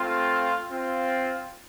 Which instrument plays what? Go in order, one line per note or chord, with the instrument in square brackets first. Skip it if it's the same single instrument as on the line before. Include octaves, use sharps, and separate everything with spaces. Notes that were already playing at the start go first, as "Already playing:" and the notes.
Already playing: [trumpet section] A3 C4 F4
C4 F4